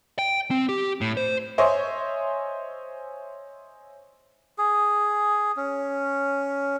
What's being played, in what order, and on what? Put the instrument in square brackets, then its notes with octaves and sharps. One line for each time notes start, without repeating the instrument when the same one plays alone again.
[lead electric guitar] G5
C4
G4
A2
C5
[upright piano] C5 C#5 D#5 E5 G#5 C6
[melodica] G#4
C#4